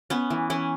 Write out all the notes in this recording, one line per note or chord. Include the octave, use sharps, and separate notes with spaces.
B3 C#4
E3
E3 C#4